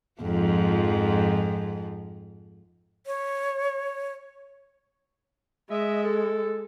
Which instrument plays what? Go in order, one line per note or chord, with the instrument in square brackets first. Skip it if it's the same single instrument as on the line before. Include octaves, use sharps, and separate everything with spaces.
[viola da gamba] F2 G#2 F3
[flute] C#5
[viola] G#3 [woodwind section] D#5 E5
[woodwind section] A4